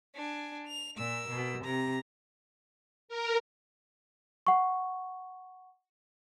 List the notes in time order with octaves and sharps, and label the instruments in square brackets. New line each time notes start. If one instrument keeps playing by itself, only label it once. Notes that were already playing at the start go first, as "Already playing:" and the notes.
[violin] D4 G#5
F7
[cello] A#2 [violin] A#4 E6
[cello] B2
[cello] C3 [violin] A#5
[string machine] A#4
[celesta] F#5 C#6